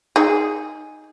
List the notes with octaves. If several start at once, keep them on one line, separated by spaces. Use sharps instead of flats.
D#4 G#4